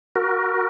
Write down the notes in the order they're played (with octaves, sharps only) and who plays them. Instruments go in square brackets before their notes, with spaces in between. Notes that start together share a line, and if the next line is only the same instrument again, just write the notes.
[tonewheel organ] F#4 A#4